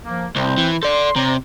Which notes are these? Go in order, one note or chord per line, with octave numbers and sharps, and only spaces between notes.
F3 A#3
C2 C4 C5
E3
A4 D5 C6
C3 C#5 D5 A#5